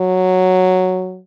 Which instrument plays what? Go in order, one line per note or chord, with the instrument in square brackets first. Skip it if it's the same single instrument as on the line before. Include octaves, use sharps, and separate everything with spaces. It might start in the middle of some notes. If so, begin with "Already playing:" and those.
Already playing: [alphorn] F#3